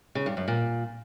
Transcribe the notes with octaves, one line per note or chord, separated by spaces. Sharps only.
C#3
G2
F#2
A#2